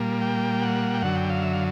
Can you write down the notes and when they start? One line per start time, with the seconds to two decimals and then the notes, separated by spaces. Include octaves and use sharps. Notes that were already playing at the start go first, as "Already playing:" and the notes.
Already playing: A#2 G3 A#3
0.21 G5
0.62 F#5
0.94 G5
1.02 F#2 D3 F#3 F#5
1.16 G5
1.30 F5
1.42 E5
1.54 F5